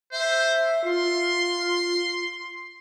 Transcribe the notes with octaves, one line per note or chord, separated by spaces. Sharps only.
C5 E5
F4 C6